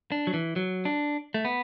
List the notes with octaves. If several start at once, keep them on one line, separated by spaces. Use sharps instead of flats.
D4
F#3
E3
F#3
D4
A3
B3